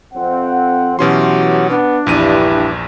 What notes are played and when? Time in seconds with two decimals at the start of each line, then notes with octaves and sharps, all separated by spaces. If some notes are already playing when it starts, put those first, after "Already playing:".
0.13 F2 C4 F#5
0.99 B2 E3 F#3 C#4 G4 C6
1.70 B3 D4
2.07 A#1 E2 G2 E4 D#7